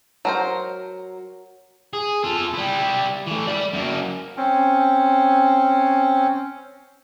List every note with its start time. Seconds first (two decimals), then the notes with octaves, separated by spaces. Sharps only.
0.25 F#3 A#4 C5
1.93 G#4
2.24 F4 A4
2.53 G3 E4
3.27 E3 A3
3.47 D5 B5
3.73 F#2 A#3
4.37 C4 C#4